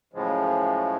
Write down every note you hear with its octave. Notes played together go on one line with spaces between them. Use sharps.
F#2 A2 C#3 F3 G#3